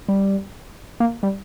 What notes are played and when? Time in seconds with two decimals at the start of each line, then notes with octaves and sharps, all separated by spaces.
0.08 G3
1.00 A#3
1.23 G3